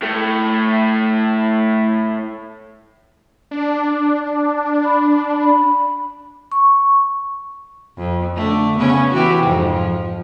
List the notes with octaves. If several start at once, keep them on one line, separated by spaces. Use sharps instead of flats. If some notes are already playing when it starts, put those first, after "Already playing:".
A2 A3
D4
B5
C#6
F2
D3 A3
C#3 B3 C#4
E3 F#4 G4
F2 G#2 C3
F3